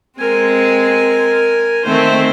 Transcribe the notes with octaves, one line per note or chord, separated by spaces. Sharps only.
G#3 C4 A#4 G#5
D#3 A3 C4 C5 E5